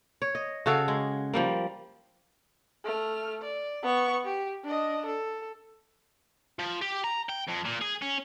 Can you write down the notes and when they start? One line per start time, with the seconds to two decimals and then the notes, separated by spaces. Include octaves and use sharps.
0.22 C#5
0.35 D#5
0.66 C#3 F#4 A4 F5
0.88 G#3
1.34 F3 G3 A#3
2.84 A3 F6
3.42 D5
3.83 B3 C#6
4.25 G4
4.64 D4 D#5
5.06 A4
6.59 F3
6.81 G4
7.04 A#5
7.29 G5
7.48 F2
7.65 A#2
7.82 G#4
8.02 C#4